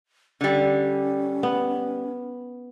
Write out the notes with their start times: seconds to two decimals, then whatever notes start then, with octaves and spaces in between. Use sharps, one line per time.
0.41 D3 G3 C#4
1.43 B3